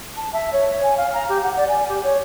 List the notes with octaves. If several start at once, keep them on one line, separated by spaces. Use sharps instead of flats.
A5
E5
C#5
G#5
F5
A#5
G4
F#5
D5
G#5
G4
C#5